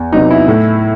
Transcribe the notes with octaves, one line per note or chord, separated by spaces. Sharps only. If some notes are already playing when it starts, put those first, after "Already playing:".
Already playing: E2
C3 F#3 B3 D#4
E4
A2